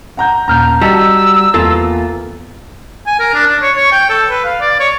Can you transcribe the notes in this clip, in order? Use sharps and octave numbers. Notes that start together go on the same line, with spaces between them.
F#5 A#5 G6
D#1 A#5 F6 G6
G3 F#4 D#5 A5 E6
E2 A#3 F4 A4
G#5
A#4
D4
D4
C#5
C#5
G5
A4
B4
F5
D5
C#5